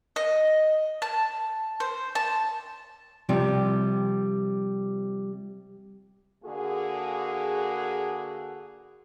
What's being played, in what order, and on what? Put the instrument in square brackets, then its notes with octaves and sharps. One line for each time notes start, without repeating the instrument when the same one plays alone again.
[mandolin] D#5
A5
C5
A5
[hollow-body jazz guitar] C3 F3 G3
[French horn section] D3 A#3 F#4 G#4